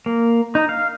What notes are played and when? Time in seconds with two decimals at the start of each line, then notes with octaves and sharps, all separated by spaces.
0.06 A#3
0.55 D#4
0.69 F5